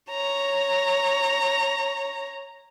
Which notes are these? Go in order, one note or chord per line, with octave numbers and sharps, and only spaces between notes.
C#5 A#5